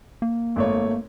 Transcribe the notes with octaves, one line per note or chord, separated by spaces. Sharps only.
A#3
G#1 A3 C#5